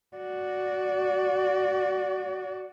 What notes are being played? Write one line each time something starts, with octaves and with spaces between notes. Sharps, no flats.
F#4 D5